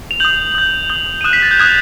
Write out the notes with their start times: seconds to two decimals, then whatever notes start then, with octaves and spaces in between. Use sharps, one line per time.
0.11 F7
0.20 D#6 G6 F#7
0.55 D#6 G6
0.89 D#6 G6 G7
1.02 F#7
1.21 D#7
1.24 D#6 F#6 E7
1.33 B6
1.42 A6
1.51 G6
1.59 D#6 F#6 G#6